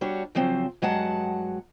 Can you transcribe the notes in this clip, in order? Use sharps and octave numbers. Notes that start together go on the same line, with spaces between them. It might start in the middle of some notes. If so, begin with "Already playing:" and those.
G3 D4 F#4 C#5
C#3 F3 F#3 C4
G2 F#3 G#3 F#5 A5